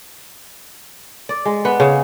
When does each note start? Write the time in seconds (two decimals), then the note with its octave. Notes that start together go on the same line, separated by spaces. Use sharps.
1.29 D5
1.45 G#3
1.65 B3
1.80 C#3